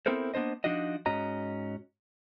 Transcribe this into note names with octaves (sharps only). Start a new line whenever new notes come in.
B3 C4 E4 A4 A#4 C5
A#3 B3 D4 C5 D#5
F3 D4 D#4 F#4 D#5
G#2 C#4 F#4 D#5 A#5